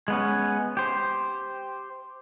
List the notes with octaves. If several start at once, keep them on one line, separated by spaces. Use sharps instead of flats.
G#3 B3 C#4
G4 C5